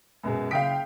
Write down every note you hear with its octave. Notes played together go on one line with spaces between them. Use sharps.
F#2 B2 G#3
F#1 F5 G5 D#6 B6 D7